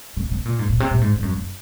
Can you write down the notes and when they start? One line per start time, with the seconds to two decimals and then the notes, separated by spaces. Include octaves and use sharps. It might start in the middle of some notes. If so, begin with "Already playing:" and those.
0.17 C3
0.31 C3
0.45 A#2
0.59 G#2
0.70 A#2
0.80 C3
0.91 A#2
1.01 G#2
1.16 G#2
1.23 F#2
1.35 F#2